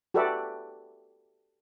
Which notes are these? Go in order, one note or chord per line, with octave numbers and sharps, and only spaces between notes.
F#4 G4 A4 B4 D5 E5